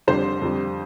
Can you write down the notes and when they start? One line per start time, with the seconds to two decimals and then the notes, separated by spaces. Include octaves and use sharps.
0.07 F2 D3 G3 C5
0.42 F2 D3 G3